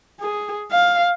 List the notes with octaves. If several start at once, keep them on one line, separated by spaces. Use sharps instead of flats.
G#4
F5